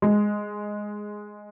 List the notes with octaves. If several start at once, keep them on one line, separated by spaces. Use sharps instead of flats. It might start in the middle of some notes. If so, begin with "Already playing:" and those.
G#3